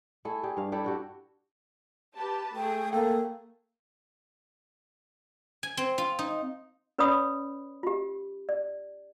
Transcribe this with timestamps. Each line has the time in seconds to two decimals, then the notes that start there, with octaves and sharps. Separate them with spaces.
0.25 A3 E4 G#4 A4
0.43 D4 G4 G#4
0.57 G2 F5
0.72 D4 E4 G4 A4
0.84 D4 F#4 G4
2.16 G4 B4 A5
2.56 A3 G#4 G5
2.93 A#3 A4 G5
5.63 G#5
5.77 C4
5.98 F4
6.19 D#4
6.98 C#4 B4 C#5 D5 B5 D#6
7.83 F4 G4
8.49 D5